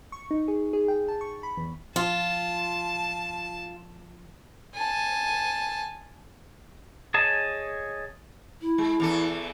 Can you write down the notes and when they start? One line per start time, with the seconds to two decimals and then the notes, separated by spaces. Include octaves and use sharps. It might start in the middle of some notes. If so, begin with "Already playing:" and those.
0.12 C#6
0.31 D#4
0.48 G#4
0.73 G#4
0.88 G5
1.08 A5
1.21 C#6
1.43 B5
1.57 E2
1.96 F3 F4 A5
4.75 G#5 A5
7.14 G#4 C#5 D#5 G#5 A5
8.62 E4
8.78 G#3
9.00 E2 E3 A4